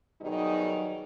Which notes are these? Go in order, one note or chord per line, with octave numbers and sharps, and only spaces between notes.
B2 D#3 F#3 G3 D#4 G#4